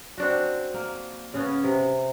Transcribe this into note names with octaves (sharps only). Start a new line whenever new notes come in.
C4 D4 F#4
A#3
C#3 B3 C#4
C3